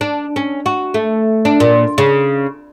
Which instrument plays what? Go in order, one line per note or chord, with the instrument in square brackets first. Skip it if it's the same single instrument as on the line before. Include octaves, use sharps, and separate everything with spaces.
[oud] D4
C#4
F#4
A3
D4
A#2
C#3